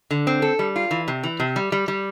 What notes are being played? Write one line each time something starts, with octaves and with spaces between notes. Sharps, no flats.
D3
C4
A4
G3
F4
E3
C3
E3
C3
G3
G3
G3